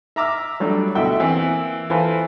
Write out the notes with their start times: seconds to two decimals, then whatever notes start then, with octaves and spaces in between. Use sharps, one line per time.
0.16 E5 A#5 D6 E6 F6
0.60 F#3 G3 A3 D4
0.95 D2 B2 D3 E4 F#4 G5
1.20 E3 A#3 C4
1.90 E3 F4 A4 B4 C5